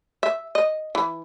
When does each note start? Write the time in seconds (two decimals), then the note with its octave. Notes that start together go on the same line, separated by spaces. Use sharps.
0.23 E5
0.55 D#5
0.95 E3